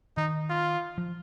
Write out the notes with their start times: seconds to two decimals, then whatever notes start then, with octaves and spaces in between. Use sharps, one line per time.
0.17 D#3 D#4
0.49 F4
0.98 F3